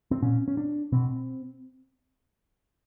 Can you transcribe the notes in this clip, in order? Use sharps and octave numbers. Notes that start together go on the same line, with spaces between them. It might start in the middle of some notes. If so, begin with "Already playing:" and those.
C4
A#2 C#4
C#4
D4
B2 C4